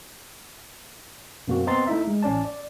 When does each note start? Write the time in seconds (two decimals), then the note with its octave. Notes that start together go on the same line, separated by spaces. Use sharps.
1.48 F#2 B2 A#3 C4 F#4
1.67 B3 C4 D#5 A#5 C6 A6
1.87 A3 D#4 E4 E5
2.07 G#3
2.23 A1 C#4 D5 A5
2.45 D5